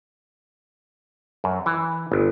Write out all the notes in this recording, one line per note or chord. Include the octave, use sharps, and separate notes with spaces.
F#2
E3
G1